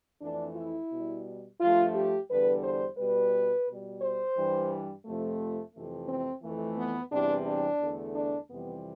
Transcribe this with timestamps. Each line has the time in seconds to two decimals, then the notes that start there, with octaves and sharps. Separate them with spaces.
0.22 F2 E3 A3 D4
0.56 E4
0.91 B2 G3
1.60 G2 F3 A3 F4
1.95 G4
2.29 E2 D3 G3 B4
2.63 C5
2.98 B2 G3 B4
3.67 B2 G3
4.01 C5
4.37 G2 E3 G3
5.06 F2 C3 F3 A3
5.74 F2 C3 E3 A3
6.09 C4
6.43 F2 E3 A3
6.78 B3
7.12 E2 C3 E3 G3 D4
7.46 D4
7.80 E2 D3 A3
8.15 D4
8.50 F2 C3 E3 G3 B3